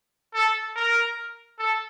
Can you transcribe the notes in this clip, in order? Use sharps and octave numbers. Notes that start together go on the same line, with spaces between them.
A4
A#4
A4